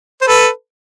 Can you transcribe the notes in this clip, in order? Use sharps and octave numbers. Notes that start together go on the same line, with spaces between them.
C5
A4 B4